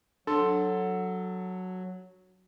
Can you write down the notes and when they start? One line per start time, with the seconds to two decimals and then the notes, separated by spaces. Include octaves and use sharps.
0.27 F#3 D4 A4 C6